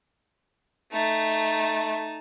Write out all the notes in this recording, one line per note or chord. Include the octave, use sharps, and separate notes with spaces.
A3 D#4 A5